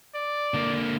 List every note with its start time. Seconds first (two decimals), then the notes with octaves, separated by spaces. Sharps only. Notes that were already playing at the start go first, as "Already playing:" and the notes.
0.15 D5
0.54 D3 A#3